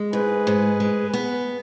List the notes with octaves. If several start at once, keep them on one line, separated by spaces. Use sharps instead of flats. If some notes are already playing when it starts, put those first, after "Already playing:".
Already playing: G#3
G#2 G#4 B4
G#2
G#3
B3